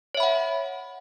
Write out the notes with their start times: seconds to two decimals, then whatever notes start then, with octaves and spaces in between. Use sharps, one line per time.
0.15 C#5
0.17 E5
0.20 B5
0.23 F#5